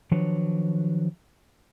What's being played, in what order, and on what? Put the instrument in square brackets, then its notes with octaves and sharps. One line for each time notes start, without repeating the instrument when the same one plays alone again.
[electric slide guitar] D#3 F3 F#3 D4 B4 C#5